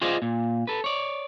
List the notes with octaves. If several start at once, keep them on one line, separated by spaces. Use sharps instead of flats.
F4 G#4 C5 D5 D#5 F5
A#2
A4 B4
C#5 D5